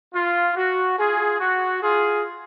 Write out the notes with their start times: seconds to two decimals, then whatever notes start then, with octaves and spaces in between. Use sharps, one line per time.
0.14 F4
0.56 F#4
0.98 F4 G#4
1.40 F#4
1.82 F4 G#4